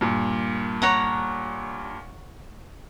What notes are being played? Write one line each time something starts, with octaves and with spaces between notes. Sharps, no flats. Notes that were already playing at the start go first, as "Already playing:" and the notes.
G2 A#2
C#5 F#5 A#5